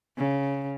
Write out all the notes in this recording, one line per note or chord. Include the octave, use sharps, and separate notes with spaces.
C#3